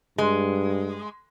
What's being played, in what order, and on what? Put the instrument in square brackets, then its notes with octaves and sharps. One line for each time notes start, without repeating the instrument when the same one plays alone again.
[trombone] G2 [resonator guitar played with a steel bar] G#3